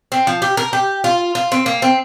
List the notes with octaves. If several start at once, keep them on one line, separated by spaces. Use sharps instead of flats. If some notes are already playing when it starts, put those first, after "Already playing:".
C4
F3
G4
A#4
G4
F4
F4
C4
A#3
C4